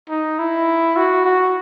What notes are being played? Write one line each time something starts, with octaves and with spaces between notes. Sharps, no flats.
D#4
E4
F#4
F#4